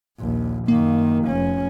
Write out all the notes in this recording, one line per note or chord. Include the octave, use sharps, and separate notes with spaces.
A#1 D#2
F#2 D#3 A#3
F1 C#4